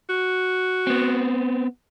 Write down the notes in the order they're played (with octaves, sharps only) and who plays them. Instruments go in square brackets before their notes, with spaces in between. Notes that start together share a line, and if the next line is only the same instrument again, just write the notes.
[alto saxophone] F#4
[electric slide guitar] B3 C4